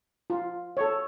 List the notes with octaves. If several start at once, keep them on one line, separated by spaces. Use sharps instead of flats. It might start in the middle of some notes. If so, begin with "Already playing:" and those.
F4
A4 C#5